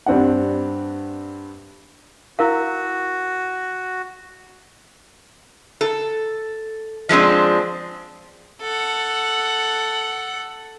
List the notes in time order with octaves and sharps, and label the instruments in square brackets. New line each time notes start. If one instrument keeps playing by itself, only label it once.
[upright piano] G2 C4 D4 F#5
[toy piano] E4 A#4 F5 [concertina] F#4
[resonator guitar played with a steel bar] A4
F3 G#3 C4 D4
[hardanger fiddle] A4 F#5